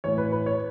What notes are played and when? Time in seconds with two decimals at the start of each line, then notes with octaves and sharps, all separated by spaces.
0.04 A2 E3 C#5
0.18 B4
0.32 B4
0.46 C#5